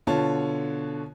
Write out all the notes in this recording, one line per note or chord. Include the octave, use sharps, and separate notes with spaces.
B2 D3 F4 C#5 A5